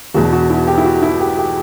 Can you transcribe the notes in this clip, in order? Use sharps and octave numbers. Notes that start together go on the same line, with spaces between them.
E1 E2 B2 F#4
F#4
E4
G4
E4
F#4
E4
G4
G4